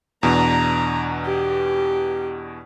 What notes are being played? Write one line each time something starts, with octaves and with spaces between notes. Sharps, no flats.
E2 B2 D4 A#5
G4